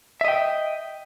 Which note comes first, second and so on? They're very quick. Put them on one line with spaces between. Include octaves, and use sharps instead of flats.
E5 D#5 G5